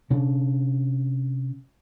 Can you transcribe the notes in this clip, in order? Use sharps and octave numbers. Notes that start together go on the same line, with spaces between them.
C3 C#4 D4